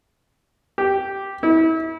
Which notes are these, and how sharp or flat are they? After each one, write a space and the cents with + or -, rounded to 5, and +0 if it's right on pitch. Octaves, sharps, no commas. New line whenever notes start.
G4 -5
E4 -35